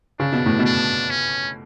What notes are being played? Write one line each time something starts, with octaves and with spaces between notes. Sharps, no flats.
C#3 D4
B2
A2
B2
D4
C#4